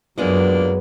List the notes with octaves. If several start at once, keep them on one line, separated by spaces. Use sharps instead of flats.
F#2 F3 F#3 G#3 A#3 B3 D4 G#4